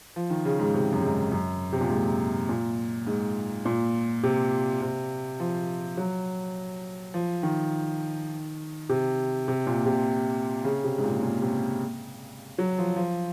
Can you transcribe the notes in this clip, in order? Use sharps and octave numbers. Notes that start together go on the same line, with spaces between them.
F3
D#3
C#3
G#2
C3
F#2
G#2
F#2
C3
A#2
G#2
A#2
G#2
A#2
C3
C3
F3
F#3
F3
D#3
C3
C3
A#2
C3
C#3
C3
G#2
A#2
A#2
C3
F#3
F3
F3